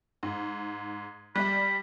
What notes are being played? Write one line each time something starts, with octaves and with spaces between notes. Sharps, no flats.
G#2
G3 D5 B5